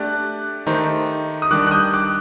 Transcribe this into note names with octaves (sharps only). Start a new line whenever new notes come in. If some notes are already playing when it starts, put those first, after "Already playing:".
Already playing: A3 D4 G4 D5 F#6
D#3 A3 D#4 G4 C5
D#6
D#3 G3 D4 D6 F#6
F#6
D#6 G6
D6 F#6